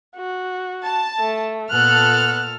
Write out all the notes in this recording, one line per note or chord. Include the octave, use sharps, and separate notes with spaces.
F#4
A5
A3
A#2 B3 A4 F6 F#6